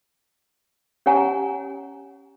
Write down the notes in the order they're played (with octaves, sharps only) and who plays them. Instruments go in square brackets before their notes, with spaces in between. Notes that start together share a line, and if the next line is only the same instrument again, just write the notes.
[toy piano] C#4 G4 C#5 F#5 G#5 A#5